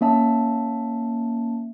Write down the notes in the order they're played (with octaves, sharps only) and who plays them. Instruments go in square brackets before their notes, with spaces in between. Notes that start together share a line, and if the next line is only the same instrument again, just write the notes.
[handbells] A#3 C#4 E5 A5